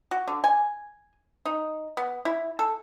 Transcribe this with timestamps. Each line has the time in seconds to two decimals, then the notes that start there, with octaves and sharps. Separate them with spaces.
0.11 F#4
0.28 D3
0.44 G#5
1.45 D#4
1.97 B3
2.25 E4
2.59 A4